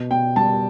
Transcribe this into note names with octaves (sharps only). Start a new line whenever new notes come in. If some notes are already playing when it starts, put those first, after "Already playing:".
Already playing: B2
B2 G5
G3 A5